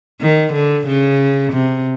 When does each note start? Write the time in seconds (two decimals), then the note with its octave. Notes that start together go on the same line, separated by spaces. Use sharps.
0.21 D#3
0.53 D3
0.87 C#3
1.53 C3